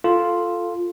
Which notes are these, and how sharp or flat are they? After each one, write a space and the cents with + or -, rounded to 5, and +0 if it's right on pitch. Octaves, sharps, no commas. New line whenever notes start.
F4 +0 A4 +0